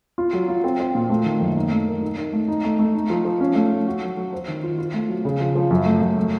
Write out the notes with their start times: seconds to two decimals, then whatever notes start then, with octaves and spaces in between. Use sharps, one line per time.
0.18 F4
0.33 F#3
0.49 F4
0.64 C4
0.80 C4
0.95 A#2
1.10 A3
1.25 D#3
1.41 F#2
1.56 D#4
1.71 A3
1.87 A#4
2.02 D#4
2.18 D#4
2.33 A3
2.48 D#4
2.64 A3
2.79 A3
2.95 D#4
3.10 F3
3.25 F3
3.40 C#4
3.55 A3
3.71 A4
3.87 F#4
4.02 F#3
4.17 F#3
4.33 C5
4.48 D#3
4.63 F4
4.78 F4
4.93 A3
5.09 F#3
5.25 C#3
5.40 F3
5.55 F3
5.71 F#2
5.86 A3
6.01 F#2
6.17 A3